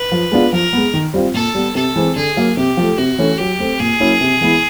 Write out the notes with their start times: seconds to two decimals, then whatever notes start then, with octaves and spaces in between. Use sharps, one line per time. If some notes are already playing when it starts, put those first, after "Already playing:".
Already playing: B4
0.12 F3
0.32 G#3 B3 D4 F4
0.53 F3 A#4
0.73 G#3 B3
0.94 D#3
1.14 G3 C4 F4
1.34 A#2 A4
1.55 G3 B3
1.75 C3 A4
1.96 E3 G#3 C4
2.16 D3 G#4
2.36 F#3 A#3
2.57 C3 G4
2.77 F3 A3
2.98 C3 F#4
3.18 E3 A3 C#4
3.38 F#3 G4
3.59 A3 C4
3.80 A#2 G#4
4.00 F#3 A#3 C#4 E4
4.21 C3
4.41 E3 G#3 B3 E4